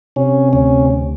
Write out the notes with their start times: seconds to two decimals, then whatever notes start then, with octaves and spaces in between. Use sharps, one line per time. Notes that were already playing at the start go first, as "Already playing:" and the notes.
0.16 C3 C#4
0.53 D2 C#4